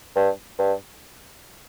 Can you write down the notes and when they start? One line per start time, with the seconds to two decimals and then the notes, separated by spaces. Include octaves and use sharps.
0.16 G2
0.59 G2